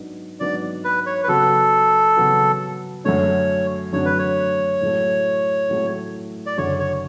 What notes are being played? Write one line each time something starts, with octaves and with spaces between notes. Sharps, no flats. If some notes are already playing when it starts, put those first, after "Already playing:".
Already playing: G#2 F#3 B3 D4
G#2 F#3 B3 D4 D5
B4
C#5
B4
C#3 F#3 B3 F#4 A4
C#3 F#3 B3 F#4
F#2 D3 F#3 A3 D4 C#5
F#2 D3 F#3 A3 D4 C#5
B4
C#5
A2 F#3 A3
A2 F#3 A3
D5
F#1 F#2 D3 C#5
C#5